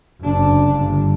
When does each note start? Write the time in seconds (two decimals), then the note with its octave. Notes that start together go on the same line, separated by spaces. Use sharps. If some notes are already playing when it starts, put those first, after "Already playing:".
0.20 F#1 D4
0.71 G1